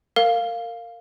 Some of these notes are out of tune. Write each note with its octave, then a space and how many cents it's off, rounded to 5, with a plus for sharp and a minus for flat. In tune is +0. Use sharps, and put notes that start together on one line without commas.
A#4 -25 F5 +0